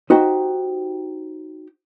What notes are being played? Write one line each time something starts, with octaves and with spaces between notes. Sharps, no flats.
D#4 F#4 G4 C5 G5